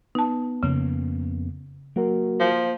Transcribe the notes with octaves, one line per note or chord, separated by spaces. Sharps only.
B3 D#4 A5
F2 C#3 A#3 C#4
F#3 A#3 F#4 A#4
F3